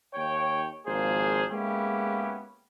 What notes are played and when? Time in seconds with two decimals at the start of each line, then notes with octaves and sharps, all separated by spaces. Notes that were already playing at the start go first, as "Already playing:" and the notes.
0.15 D#2 C#5 G5
0.87 G#1 F3 A#3 G#4 C5
1.52 G#3 A#3 B3 C#4 E4 G4